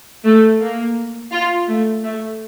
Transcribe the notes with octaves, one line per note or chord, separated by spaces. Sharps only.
A3
A#3
F4
A3
A3